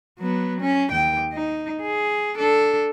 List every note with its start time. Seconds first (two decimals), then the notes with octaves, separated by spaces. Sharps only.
0.19 F#3 B3
0.60 C#4
0.91 D#2 G5
1.32 D#4
1.82 G#4
2.36 D4 A4